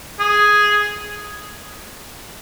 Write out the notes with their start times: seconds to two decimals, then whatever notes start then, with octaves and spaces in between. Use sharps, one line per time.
0.20 G#4